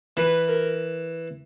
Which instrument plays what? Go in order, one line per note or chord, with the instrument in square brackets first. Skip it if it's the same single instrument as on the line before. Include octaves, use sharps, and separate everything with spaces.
[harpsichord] E3 [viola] B4
[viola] A#4